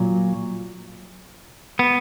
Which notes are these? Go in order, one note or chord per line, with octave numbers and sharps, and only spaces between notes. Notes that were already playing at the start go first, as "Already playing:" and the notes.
Already playing: A#2 F#3
B3